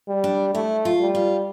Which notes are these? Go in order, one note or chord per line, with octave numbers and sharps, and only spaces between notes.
G3
D4
A3 E4
F4
G3
F4